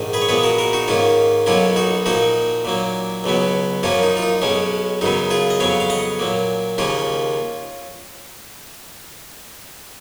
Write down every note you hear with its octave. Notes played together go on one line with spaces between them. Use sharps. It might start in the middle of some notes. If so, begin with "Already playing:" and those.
Already playing: A#1 G#2 D#3
G#4 B4
C#5
A#2 F3 G#3 B3 G#4 B4
F#4 A#4
F#4 A#4
D#4 F#4
G#2 D#3 A#3 C#4 F4
B1 B2 F#3 A#3 C#4 F4
D#4 F#4
A#2 F3 A#3 D#4 F#4
A#2 F#3 A#3
C#2 B2 F#3 B3
F#2 F3 A#3 C#4 F4
D#4
F4
D#4
B1 B2 G#3 C#4
F#2 C#3 F#3 B3 D#4
F4 G#4
D#5
F2 C#3 F#3 B3 C#5 F5
F5
D#5 F#5
A#2 F#3 A#3
D#2 C#3 F3 A#3 C#4 F4